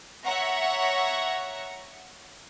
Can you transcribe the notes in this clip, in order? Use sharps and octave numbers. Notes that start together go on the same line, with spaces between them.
C#5 E5 F#5 A#5 C#6